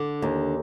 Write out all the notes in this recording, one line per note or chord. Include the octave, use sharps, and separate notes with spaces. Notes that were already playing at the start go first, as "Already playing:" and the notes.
Already playing: D3
D#2